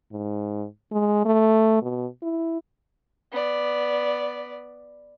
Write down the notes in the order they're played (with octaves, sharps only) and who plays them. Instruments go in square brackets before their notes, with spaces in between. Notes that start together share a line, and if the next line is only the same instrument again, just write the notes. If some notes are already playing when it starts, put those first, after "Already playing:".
[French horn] G#2
G#3
A3
B2
E4
[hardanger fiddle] B3 D5